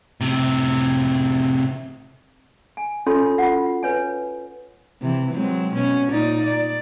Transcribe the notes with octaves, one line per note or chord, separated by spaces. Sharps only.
A2 C3
G#5
C#4 D4 F4 A4 C#5 C6
F4 F#4 F#5
B4 C#5 G#5
C3 E3
F#3 G#3 C4
B2 C#4
A#2 D#4 D5
D5